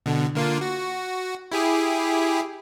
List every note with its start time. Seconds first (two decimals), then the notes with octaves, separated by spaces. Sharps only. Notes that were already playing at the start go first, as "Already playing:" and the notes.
0.06 B2 D3
0.35 D3 A#3 F4
0.61 F#4
1.52 E4 G4 G#4